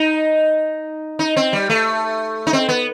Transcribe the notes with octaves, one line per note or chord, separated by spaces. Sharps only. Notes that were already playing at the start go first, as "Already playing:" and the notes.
Already playing: D#4
D#4
C4
G3
A3
D#4
C4
B3